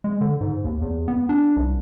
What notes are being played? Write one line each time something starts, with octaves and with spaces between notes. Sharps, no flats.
G#3
D3
G#2
D#2
E2
B3
D4
C2